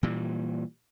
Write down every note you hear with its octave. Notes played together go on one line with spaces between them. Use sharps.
A#2 E3 G3